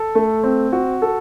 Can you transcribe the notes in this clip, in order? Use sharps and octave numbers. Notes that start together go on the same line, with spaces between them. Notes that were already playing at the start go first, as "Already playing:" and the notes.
Already playing: A4
A3
C4
F#4
A4